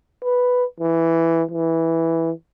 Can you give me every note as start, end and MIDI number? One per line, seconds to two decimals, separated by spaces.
0.23 0.64 71
0.80 1.43 52
1.51 2.31 52